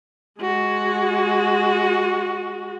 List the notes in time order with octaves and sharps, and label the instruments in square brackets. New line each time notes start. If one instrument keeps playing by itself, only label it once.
[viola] G#3 F#4